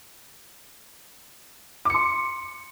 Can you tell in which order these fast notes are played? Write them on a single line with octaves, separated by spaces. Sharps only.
D6 C#7 C6